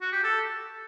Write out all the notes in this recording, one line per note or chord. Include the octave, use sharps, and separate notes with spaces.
F#4
G4
A4